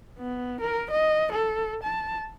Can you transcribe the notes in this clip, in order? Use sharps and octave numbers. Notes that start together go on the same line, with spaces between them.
B3
A#4
D#5
A4
A5